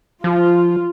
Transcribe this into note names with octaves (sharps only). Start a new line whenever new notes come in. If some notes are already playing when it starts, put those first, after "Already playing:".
F3 F4